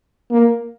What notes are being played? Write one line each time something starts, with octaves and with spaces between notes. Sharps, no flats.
A#3